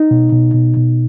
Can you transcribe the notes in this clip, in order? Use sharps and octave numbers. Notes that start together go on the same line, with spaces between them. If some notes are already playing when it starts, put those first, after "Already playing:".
Already playing: D#4
B2
B2
B2
B2